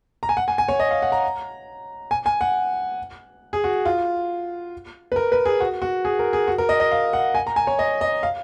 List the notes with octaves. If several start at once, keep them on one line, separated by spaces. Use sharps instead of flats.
A#5
G#5
F#5
G#5
G#5
C#5
D#5
F5
F#5
A#5
G#5
G#5
F#5
G#4
F#4
F4
B4
A#4
B4
G#4
F#4
F#4
G#4
A#4
G#4
F#4
A#4
D#5
D#5
F5
F#5
G#5
A#5
G#5
C#5
D#5
D#5
F5